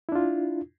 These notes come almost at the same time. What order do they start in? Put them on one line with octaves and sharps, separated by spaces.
E4 D4 F4